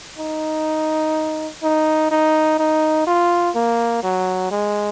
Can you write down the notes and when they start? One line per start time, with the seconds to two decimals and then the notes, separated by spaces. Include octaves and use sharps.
0.18 D#4
1.63 D#4
2.11 D#4
2.59 D#4
3.07 F4
3.55 A#3
4.03 F#3
4.51 G#3